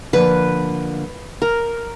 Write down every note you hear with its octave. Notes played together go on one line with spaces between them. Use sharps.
D3 F3 A#3 B4
A#4